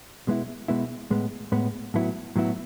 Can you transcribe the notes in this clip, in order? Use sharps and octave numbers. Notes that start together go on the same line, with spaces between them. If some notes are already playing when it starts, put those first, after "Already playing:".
B2 G#3 B3 E4
B2 G#3 B3 E4
A2 G#3 B3
A2 G#3 B3
A2 F#3 B3 E4
A2 F#3 B3 E4